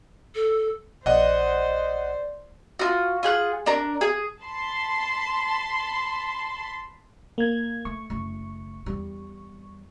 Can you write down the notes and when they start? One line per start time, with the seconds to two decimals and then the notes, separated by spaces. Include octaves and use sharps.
0.35 A4
1.06 A#1 C5 D5 D#5 F#5
2.79 F4 F#4
3.23 F4 G#4 F#5
3.66 D4 A#4
4.01 G#4
4.43 A5 B5 C6
7.38 A#3 G#6
7.85 A3 C#6
8.10 F#1 A3
8.86 E2 G3